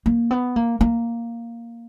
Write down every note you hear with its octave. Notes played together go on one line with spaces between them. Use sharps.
A#3
B3
A#3
A#3